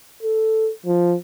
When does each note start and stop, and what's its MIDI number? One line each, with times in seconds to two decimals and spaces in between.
0.23 0.70 69
0.86 1.16 53